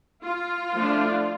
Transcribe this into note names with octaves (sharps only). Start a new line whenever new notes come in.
F4
F3 A3 D4